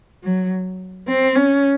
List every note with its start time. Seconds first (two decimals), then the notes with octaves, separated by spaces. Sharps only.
0.23 F#3
1.07 C4
1.36 C#4